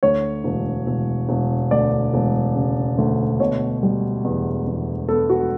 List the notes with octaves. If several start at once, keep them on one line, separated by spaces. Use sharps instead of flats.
D2 C#5
E1
E1
E1
D2 D5
E1
C#3
D2
B2 C#5
G3
E2
E2
B3 A4
F#4